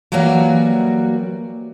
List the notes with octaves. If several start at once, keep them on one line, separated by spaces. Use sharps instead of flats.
E3 F#3 G3 A#3 F#4